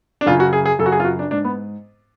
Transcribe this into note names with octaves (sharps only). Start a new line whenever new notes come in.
D4
F#2 C#3 F4
F#4
G#4
G#4
F#2 C#3 A4
F#4
G#4
F4
F#4
D4
G#2 D4
B3